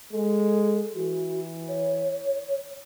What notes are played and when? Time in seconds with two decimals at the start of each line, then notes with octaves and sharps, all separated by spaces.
0.12 G#3 A4
0.95 E3 F#4
1.68 C#5